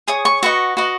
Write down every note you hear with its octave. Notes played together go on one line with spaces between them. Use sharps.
G#4 C#5 D#6
C#6
F#4 B4 D#5 C#6
F#4 B4 D#5